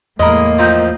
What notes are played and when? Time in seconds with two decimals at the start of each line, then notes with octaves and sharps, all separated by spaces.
0.20 E2 A2 G#3 A#3 A#4 D#5 B5
0.59 F3 C4 D#4